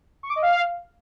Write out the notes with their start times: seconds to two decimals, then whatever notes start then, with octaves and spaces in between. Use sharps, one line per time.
0.23 C#6
0.29 D6
0.36 D#5
0.42 F5